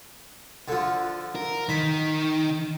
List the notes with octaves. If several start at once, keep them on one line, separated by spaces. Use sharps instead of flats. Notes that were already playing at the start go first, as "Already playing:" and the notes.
D3 F3
A#4
D#3 B5